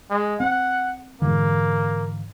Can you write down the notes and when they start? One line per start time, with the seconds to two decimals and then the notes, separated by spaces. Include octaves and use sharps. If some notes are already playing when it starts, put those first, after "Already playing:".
0.10 G#3
0.40 C4 F#5
1.22 G#2 D3 E3 A#3